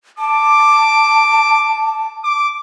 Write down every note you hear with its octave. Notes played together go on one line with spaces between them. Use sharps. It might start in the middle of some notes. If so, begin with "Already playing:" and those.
A5 D6
D6